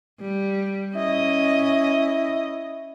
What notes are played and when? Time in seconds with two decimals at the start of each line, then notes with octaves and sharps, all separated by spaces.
0.20 G3
0.95 C#4 E4 D#5